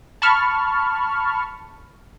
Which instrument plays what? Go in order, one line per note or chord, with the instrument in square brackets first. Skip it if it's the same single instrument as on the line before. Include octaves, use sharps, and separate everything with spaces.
[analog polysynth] A5 B5 C#6 F6